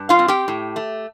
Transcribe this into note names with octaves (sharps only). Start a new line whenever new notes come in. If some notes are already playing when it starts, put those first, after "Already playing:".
Already playing: G2
F4 F5
C4
G4 G5
A2
A3